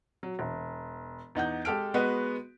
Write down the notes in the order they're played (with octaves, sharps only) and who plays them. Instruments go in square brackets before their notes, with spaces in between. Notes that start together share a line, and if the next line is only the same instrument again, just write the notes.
[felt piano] F#3
E1
E2 D#4 F#5 G6
G#3 G4 A4 F6 D7
G#3 B3 F#4 B4 D#5